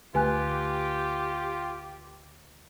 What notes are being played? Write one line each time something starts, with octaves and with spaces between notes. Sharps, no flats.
D2 A3 F4 G4 B4 G#5 F#6